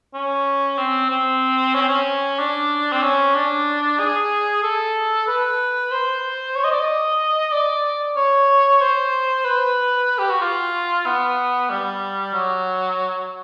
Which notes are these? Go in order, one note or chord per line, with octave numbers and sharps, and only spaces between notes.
C#4
C4
C4
C#4
C4
C#4
D4
C4
C#4
D4
G#4
A4
B4
C5
C#5
D#5
D5
D#5
D5
C#5
C5
B4
G4
F#4
F4
B3
G3
F#3